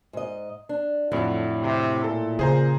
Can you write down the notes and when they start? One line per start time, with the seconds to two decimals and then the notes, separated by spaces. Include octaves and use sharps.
0.13 G#2 D#5
0.69 D4
1.12 F2 A2 D3 F#3 E4
1.62 C3
2.04 A#2 A4
2.39 C#3 G#4 C5 A#5